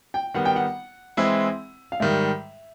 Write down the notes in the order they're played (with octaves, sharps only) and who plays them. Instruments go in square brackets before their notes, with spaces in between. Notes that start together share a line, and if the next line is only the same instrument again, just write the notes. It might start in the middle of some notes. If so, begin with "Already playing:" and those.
[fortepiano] G5
[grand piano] D#3 G3 B3 [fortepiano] F#5
[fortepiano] G5
F#5
[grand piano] E3 G#3 C4 E4
[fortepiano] F5
[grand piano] G#2 D#3 G3 [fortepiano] E5